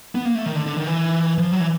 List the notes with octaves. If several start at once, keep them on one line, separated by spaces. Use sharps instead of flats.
B3
A#3
A3
D#3
D3
D3
D#3
E3
F3
F#3
E3